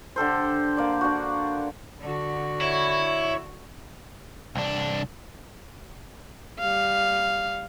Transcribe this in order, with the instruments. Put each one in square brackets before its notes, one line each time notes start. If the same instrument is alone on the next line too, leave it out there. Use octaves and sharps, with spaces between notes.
[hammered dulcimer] D3 G4 A4 C5
A#3 D5
D4 F#4
[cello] D3 F#4
[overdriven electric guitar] E4 [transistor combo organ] C#5
[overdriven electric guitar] C2 D4
[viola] G3 F5